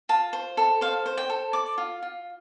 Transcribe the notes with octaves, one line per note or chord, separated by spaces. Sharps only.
F4 A5
C5
A4
C5 F5
C5
G5
A4
D5 D6
F4
F4